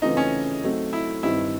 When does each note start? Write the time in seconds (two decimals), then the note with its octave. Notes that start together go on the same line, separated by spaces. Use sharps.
0.02 C#3 E3 A3 C4 D#4 F4
0.17 C#4
0.63 F#3 A3 C4 D#4
0.93 E4
1.23 G2 D#3 G3 C4 D#4 E4